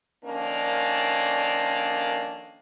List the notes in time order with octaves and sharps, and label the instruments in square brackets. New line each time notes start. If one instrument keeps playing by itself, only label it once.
[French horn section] D3 D#3 F3 A#3 C#4 D4